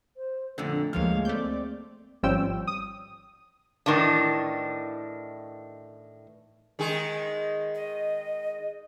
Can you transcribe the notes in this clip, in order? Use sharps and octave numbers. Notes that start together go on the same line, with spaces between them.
C5
F2 A#2 D3 A3
D2 G#2 F3 G#3 A#3 C#5 F5 F6
A3 C4 D5 G6
G#1 F3 G3 C#4 G5 E6
D#6
A2 D#3 E3 D4
D#3 G#3 G#4
D#5